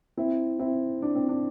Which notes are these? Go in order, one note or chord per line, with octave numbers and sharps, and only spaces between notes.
C4 E4
C4 E4
D4
C4
D4